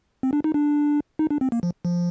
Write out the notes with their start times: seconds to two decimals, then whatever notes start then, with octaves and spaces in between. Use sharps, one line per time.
0.23 C4
0.33 D4
0.44 D#4
0.54 D4
1.19 D#4
1.30 D4
1.41 C4
1.52 A#3
1.63 F3
1.85 F3